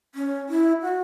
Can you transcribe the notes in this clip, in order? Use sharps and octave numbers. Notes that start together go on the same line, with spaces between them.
C#4
E4
F#4